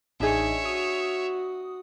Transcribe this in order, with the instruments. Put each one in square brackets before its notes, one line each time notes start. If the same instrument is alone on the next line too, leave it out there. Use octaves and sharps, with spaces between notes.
[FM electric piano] A1 D#4 D#5 [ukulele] D4 G#4 [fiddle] C#5 E5
[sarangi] F#4 [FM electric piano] D#6